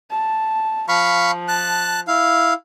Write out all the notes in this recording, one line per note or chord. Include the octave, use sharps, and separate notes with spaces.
A5
F3 F5 B5 C#6
A5 F#6
E4 F5